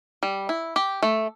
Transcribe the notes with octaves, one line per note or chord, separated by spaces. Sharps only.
G3
E4
G4
A3